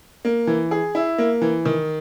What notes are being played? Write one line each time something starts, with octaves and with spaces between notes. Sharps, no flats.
A#3
E3
G#4
E4
A#3
E3
D#3